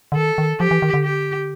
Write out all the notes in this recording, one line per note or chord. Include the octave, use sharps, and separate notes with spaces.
D3
D#3 A4
D#3
F3 G4
E3
D#3
D3
G4